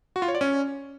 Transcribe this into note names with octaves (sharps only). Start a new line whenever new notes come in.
F#4
F4
C#5
D5
C#4